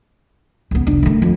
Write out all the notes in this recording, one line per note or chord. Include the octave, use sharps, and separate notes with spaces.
C#2 B3
F1 D4
D#3 A3
F2